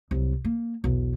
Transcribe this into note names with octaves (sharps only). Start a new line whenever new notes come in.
C2 F#3
A#3
B1 E2